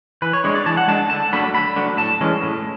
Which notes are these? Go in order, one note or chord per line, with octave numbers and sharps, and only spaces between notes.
E3 B4
C#5
G#3 D4 C#5
D5
E3 A5
F#5
G#3 D4 A5
D3 A5
F#3 A3 D4 B5
D3 B5
F#3 A3 D4
A2 A5
E3 G#3 C#4
A2